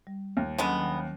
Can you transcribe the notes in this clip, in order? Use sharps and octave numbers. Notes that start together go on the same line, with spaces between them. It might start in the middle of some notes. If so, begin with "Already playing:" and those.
G3
D#2
D3 F#3 G#3 B3 C#4
D#3